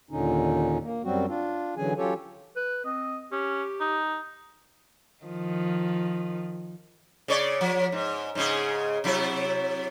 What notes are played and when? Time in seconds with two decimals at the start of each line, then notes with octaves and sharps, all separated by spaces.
0.11 D#2 A#2 D3 C#4 D#4
0.83 A#3
1.04 F#2 F#3 G3 C4 F#4
1.28 D4 F4
1.77 D3 E3 F#3 C#4 G#4 G#5
1.97 F#3 C#4 F4 G4 A4 C#5
2.56 B4
2.85 C4 D#5
3.32 C#4 G4
3.80 D#4
5.24 D#3 F3
7.28 C#3 C#5 D5
7.61 F3
7.92 G#2
8.35 G#2 C#3 G#4
9.04 C3 F#3 E4